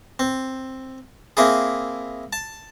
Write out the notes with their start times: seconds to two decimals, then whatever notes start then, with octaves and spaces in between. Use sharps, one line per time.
0.19 C4
1.37 A#3 C4 E4 G#4
2.33 A5